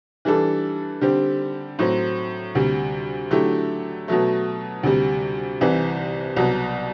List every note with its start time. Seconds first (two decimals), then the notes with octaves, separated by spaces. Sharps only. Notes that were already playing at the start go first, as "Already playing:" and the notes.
0.25 E3 G3 D4 A4
1.01 D3 G3 C4 G4
1.79 A2 F#3 C4
2.55 D2 C3 G3
3.31 D3 F#3 A3 E4 G4
4.08 B2 F#3 A3
4.83 D2 C3 G3
5.61 C2 C3 E3
6.36 C2 B2 F#3